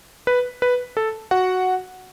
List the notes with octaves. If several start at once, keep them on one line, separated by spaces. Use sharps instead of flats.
B4
B4
A4
F#4 F#5